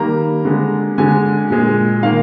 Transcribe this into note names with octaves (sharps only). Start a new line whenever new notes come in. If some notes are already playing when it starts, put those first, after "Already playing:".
Already playing: D#3 G3 A#3 A#5
D3 G#3
D3 G#3 G#5
A#2 G#3
D#3 A#3 F5